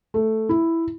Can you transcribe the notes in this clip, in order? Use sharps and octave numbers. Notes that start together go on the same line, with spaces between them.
A3
E4